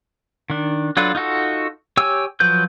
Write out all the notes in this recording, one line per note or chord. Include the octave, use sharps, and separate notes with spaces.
D#3 D4
F#3 D4 F4 A4 B4
D#4 F4 F#4 A4
G4 C#5 G5 G#5 E6
F3 F#3 B4 G6